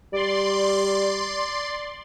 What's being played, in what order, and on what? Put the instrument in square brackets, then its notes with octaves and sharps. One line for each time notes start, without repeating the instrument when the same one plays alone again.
[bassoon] G3 [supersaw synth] D5 C6